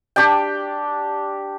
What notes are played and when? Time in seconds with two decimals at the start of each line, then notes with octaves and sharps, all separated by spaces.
0.16 D4 G4 D5 G5